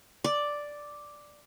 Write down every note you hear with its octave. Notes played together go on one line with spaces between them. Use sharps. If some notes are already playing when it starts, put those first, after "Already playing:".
D5